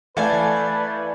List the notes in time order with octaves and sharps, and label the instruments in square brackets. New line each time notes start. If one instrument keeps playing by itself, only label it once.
[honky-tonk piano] E3 A3 [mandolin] A4 F5 G#5 [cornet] B4 [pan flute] D5